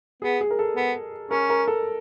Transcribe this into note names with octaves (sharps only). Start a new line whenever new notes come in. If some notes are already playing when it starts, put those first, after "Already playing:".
B3 G#4
G#4
A#4
A4
B3
C#4 A#4
A#4
A4